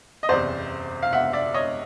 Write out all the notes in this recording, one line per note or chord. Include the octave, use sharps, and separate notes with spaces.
D#5
F#1 E2 C3 C5 D5
F5
E5 F#5
D5 E5
C#5 D#5